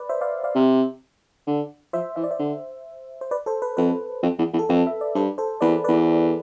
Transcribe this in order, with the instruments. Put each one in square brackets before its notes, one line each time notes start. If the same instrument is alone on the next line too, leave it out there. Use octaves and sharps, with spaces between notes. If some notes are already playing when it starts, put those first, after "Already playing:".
Already playing: [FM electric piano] B4 D5
C5 E5
D5 F5
D5 F5
[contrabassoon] C3
D3
[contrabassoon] F3 [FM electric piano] C5 E5
[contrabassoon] E3 [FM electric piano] E5
[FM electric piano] D5
C5 E5
[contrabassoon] D3
[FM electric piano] C5
B4 D5
A4 C5
B4
[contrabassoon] F2 [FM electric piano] B4
[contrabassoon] F2
E2
E2
[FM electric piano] A4
[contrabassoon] F2 [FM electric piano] B4
[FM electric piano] E5
D5
[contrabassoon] G2 [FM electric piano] A4 C5
[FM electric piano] A4 C5
[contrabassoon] E2 [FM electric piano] B4 D5
[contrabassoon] E2 [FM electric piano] B4 D5